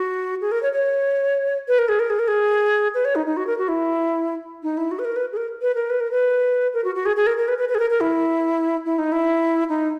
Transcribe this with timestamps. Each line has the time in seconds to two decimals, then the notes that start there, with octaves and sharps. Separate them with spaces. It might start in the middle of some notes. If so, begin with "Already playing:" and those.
Already playing: F#4
0.41 G#4
0.52 A#4
0.63 C#5
0.73 C#5
1.68 B4
1.79 A#4
1.89 G#4
1.99 A#4
2.10 G#4
2.19 A#4
2.28 G#4
2.94 B4
3.05 C#5
3.15 D#4
3.26 D#4
3.37 F#4
3.47 A#4
3.58 F#4
3.68 E4
4.63 D#4
4.77 E4
4.91 F#4
4.99 B4
5.05 A#4
5.16 B4
5.32 G#4
5.37 A#4
5.62 B4
5.75 A#4
5.90 B4
6.00 A#4
6.11 B4
6.74 A#4
6.84 F#4
6.95 F#4
7.06 G#4
7.16 G#4
7.27 A#4
7.37 A#4
7.48 B4
7.58 B4
7.69 B4
7.75 G#4
7.79 A#4
7.90 A#4
8.01 E4
8.85 E4
8.98 D#4
9.12 E4
9.69 D#4